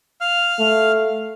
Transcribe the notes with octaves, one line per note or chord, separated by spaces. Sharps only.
F5 F6
A3